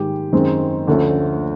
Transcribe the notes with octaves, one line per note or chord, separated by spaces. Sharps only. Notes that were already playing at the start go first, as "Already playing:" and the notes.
Already playing: G#2 D#3 G#3 G4
F#2 D#3 G#3 C4
D2 D3 F3 A3 C#4